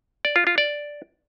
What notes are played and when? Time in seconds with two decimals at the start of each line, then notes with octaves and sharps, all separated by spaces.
0.25 D5
0.36 F4
0.47 F4
0.58 D5